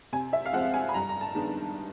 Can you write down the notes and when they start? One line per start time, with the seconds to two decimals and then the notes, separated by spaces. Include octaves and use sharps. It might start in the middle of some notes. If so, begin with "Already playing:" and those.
0.12 C3 G#5
0.33 E5
0.45 F5
0.53 F3 G#3 C4 F#5
0.74 G#5
0.89 B5
0.94 G2 A#5
1.09 A#5
1.21 A5
1.35 D#3 G#3 B3 D4